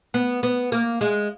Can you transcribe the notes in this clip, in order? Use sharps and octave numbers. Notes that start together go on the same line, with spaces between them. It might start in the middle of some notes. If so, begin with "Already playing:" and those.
B3
B3
A#3
G#3